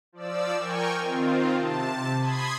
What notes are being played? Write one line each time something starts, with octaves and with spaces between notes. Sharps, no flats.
F3 D5 E6
A#4 G5 G#5 C#6
D#3 C4 F4
C3 A5
B5 C6 D#6 G#6